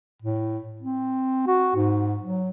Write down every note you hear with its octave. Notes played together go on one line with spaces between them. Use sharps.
A2
C4
F#4
G#2
F#3